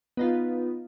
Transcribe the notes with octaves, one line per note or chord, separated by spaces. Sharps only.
B3 D#4 F4